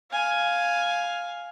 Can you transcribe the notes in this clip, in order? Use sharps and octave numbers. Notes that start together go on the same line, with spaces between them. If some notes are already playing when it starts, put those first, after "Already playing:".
F5 G#5